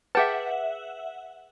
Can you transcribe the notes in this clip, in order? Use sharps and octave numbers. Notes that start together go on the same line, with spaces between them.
G#4 B4 E5 F#5 G5 A5